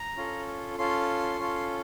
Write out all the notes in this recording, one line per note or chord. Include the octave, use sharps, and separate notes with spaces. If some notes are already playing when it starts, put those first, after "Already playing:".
Already playing: A#5
C#4 F4 A4
C#4 F4 A4 C6
C#4 F4 A4